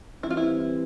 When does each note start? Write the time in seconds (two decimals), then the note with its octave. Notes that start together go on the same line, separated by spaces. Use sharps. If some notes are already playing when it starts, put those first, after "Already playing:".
0.23 E3 G3 C4 E4
0.30 F4
0.37 E4